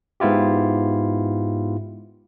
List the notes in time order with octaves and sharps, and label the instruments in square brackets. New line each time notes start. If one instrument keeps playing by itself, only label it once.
[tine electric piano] G#2 B3 E4 F4 G4